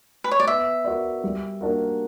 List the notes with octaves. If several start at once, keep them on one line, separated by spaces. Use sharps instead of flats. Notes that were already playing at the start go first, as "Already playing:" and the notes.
B4
C#5
D5
B3 E5
F#4 A#4 D5
G3
A#3 D4 F#4 A#4